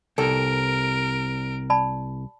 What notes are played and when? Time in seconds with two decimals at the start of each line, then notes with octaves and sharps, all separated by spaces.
0.18 C2 A4 A#4 D7
1.70 D5 A5 B5